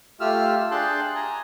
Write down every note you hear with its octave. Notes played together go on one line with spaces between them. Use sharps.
A3 F4 G4 E6 F6
D4 G#4 G5 A5 C6 F#6
G#5 A#5